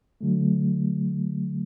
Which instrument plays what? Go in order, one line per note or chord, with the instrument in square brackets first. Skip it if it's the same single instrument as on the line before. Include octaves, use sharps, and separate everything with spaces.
[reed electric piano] D3 F#3 A3